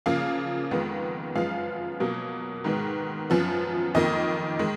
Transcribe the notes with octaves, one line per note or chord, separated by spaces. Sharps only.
C#3 F3 A#3 F5
F2 D#3 G#3 B3
F#2 F3 G#3 B3 F5
B2 F#3 A#3
G#2 D#3 G#3 B3
F#2 F3 B3
F2 D#3 A#3 D#5
D#3 G#3